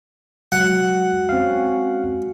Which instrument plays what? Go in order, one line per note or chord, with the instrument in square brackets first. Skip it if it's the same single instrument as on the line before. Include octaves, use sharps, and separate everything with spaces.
[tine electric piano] F#3 [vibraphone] G#3 F#4 [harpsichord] F#5
[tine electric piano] C4 F5 [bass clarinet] C#4